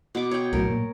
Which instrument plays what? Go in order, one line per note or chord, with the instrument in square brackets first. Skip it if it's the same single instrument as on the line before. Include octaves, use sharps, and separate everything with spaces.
[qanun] B2 D6
C#5 G5
[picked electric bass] B1 A2 F#3 [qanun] A#4
[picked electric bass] A#2